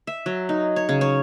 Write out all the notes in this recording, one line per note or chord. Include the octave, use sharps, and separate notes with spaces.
E5
F#3
D#4
C#5
C#3
C#5